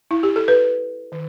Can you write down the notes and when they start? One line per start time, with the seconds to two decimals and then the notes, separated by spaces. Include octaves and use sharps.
0.11 E4
0.23 G4
0.36 A4
0.48 B4
1.12 D#3